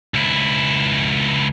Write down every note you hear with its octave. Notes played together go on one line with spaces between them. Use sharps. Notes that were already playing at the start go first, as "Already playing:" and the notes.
C#2 E4